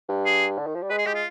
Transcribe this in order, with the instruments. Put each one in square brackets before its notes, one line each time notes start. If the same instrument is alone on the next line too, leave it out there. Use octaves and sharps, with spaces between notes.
[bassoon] G2
[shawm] G#4
[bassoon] D3
D#3
F3
G3
[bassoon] G#3 [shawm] B4
[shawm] G#4
[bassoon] G#3 [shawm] G4
[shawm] F4